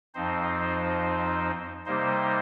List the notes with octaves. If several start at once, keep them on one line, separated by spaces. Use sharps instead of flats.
F2 F3 C4 D#4 C5
C3 G3 A#3 D#4 C5